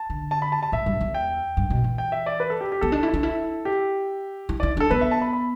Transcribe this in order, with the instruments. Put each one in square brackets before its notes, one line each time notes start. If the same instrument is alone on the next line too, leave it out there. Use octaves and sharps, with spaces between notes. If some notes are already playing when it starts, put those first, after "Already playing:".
Already playing: [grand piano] A5
[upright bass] D3
[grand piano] A5
B5
A5
A5
[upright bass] A2 [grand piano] E5
[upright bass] G2
E2
[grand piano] G5
[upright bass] G2
B2
E3
[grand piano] G5
E5
D5
B4
A4
G4
G4
[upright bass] B3 [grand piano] A4
[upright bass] D4
E4
D4
E4
[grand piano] G4
[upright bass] E4
[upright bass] E4 [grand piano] D5
[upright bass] D4 [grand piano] A4
[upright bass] B3 [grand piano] B4
[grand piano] E5
A5
B5
B5